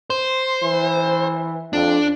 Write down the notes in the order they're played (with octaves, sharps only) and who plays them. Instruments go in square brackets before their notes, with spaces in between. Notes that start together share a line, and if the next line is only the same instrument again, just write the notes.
[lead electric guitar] C5
[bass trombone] E3
[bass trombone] F2 [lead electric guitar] D4